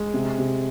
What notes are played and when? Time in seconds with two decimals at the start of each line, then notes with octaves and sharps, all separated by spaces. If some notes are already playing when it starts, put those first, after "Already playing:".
Already playing: G#3
0.14 C3
0.38 C3